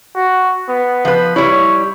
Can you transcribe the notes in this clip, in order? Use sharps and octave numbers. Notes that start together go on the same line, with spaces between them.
F#4
B3
F3 B4
G3 E4 C#5